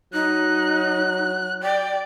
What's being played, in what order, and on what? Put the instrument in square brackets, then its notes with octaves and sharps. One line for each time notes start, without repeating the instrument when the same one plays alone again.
[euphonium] F#3 [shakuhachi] D#4 [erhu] F#6
[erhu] D5 [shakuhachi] G5